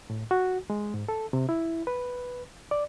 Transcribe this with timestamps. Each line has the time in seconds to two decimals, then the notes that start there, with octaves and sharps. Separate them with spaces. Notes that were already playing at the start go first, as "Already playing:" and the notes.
0.10 A2
0.31 F#4
0.70 G#3
0.94 G#2
1.08 A4
1.33 C3
1.49 E4
1.87 B4
2.71 D5